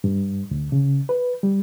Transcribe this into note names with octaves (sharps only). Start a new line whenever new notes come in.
G2
D2
C#3
B4
G3